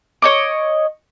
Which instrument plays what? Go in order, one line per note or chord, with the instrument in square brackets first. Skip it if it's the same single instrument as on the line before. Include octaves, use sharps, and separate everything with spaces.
[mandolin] C#5 D#5 D6